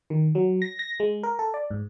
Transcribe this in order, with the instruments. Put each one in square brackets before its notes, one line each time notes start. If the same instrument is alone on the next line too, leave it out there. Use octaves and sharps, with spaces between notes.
[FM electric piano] D#3
F#3
A#6
A#6
G#3
A#4
A4
D5
G#2